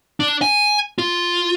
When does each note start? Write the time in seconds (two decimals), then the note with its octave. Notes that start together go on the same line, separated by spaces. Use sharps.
0.20 D4
0.42 G#5
0.98 F4